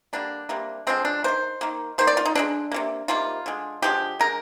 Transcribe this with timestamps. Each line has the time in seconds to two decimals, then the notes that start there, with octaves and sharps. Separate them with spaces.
0.13 D3 G3 A#3 D4
0.49 C3 G3 A#3
0.87 D3 F3 G#3 C4
1.05 D4
1.24 D#3 A#3 C5
1.61 D#3 A#3
1.98 D#3 A#3 C5
2.07 D5
2.17 F4
2.25 D#4
2.35 D3 F3 G#3 D4
2.72 C3 D#3 A#3
3.08 C3 D#3 G3 A#3 F4
3.46 D3 G#3
3.82 D3 F3 G#3 G4
4.19 D3 G#3 A#4